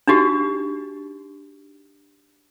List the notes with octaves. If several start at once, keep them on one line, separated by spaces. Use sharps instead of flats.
D4 D#4 F#4 G4